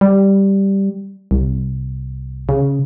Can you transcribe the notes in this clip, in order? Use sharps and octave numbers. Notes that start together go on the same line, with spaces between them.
G3
C2
C#3